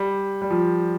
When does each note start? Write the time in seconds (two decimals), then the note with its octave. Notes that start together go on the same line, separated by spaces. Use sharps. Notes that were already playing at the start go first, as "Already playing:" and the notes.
Already playing: G3
0.42 G3
0.51 F3